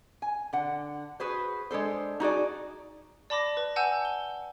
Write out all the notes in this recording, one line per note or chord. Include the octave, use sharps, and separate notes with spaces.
G#5
D3 F#5
F#4 G#4 B4 C5
G#3 D4 A4 C5
D#4 F#4 G#4 D5
D5 A5 B5 D6 A#6
B4
F#5 G#5 A5 E6 G6
G7